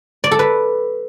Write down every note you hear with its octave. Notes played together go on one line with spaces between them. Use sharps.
D5
A4
B4